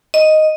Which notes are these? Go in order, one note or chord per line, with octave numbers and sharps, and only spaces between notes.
D#5